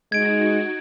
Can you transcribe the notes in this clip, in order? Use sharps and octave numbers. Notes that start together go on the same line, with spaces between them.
G#3 D#4 F#4 G#6 D7